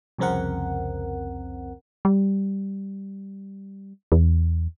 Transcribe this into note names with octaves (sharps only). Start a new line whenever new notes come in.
C2 F2 C#3 C4 A#4 F#5
G3
E2